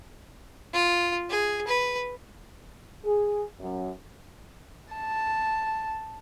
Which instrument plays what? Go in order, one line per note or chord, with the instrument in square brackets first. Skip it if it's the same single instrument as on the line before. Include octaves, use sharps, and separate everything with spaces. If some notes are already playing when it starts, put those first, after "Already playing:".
[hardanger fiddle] F4
G#4
B4
[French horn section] G#4
F#2
[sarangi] A5